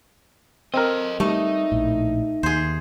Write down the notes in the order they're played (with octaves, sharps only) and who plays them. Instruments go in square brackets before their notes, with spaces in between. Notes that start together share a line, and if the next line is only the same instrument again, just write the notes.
[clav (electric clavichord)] C4 A#4 [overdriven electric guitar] A4 D#5
[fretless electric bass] G3 [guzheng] A3 [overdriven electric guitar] D#4
[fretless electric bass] A#1 A2
[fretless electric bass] D#2 [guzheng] G#4 C5